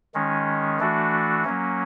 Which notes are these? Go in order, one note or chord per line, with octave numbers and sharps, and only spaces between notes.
D#3 G#3 C#4
E3 A3 D4 F#4
F#3 A#3 C#4